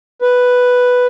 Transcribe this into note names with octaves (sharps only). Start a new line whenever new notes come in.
B4